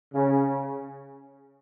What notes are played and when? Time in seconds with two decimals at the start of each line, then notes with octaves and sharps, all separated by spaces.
0.13 C#3